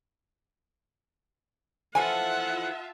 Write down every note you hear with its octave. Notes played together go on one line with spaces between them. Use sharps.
E3 F3 F4 A4 E5 F#5 G#5 A5